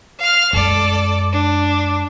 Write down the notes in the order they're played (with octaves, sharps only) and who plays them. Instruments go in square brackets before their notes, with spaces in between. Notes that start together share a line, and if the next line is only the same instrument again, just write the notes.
[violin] F5 F6
[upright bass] F#2 G#3 [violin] A4 D5
[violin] D4